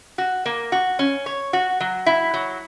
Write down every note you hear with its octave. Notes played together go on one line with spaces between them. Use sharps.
F#4
A#3
F#4
C#4
C#5
F#4
F#3
E4
F#3